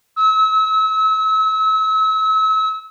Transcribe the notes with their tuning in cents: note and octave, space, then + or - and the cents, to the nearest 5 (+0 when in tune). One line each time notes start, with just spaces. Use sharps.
E6 -35